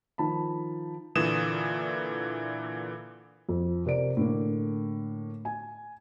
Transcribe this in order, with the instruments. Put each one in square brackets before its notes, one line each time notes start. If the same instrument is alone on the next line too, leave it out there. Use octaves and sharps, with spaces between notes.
[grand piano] D#3 F3 A5 B5
[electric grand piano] A#2 D3 E3 D#6 E7
[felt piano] F2
C3 A#4 D5 D7
A2 D3 A#3
G#5